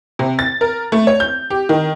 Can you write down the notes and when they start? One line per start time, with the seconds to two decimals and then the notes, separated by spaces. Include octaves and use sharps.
0.19 C3
0.39 A6
0.61 A#4
0.92 A3
1.07 C#5
1.20 G6
1.50 G4
1.69 D#3